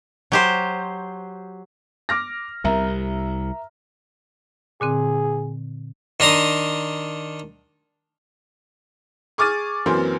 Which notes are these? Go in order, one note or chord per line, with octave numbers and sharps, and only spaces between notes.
F#3 G4 C5
D6 F6 A#6
C2 C3 A#4 E5 A#5
A#2 D3 C4 G#4
D#3 D4 A#5 C6 D#6
G#4 C#6 D6 F6 A6 D#7
F#2 E3 F#3 A#3 C4 C6